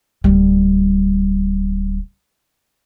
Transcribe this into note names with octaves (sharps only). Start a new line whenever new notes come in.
D1 G3